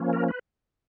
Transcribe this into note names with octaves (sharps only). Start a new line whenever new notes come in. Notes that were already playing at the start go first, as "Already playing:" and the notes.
Already playing: F3 A#3 C#4
A#4
B4